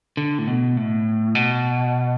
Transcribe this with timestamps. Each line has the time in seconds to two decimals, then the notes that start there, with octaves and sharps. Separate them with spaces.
0.17 D3
0.39 A2
0.47 B2
0.77 A2
1.35 B2